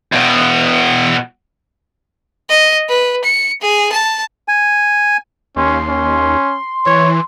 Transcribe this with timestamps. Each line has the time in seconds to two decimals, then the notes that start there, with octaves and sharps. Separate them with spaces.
0.12 E2 B2
2.49 D#5
2.89 B4
3.24 C#7
3.61 G#4
3.92 A5
4.48 G#5
5.56 D#2 C#4 C6
5.88 C#4
6.86 E3 C#5